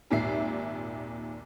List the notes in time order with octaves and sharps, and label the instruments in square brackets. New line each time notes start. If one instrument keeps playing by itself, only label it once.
[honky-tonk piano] G#1 D#2 A#2 E5 C7